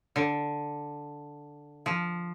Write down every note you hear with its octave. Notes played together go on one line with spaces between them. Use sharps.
D3
F3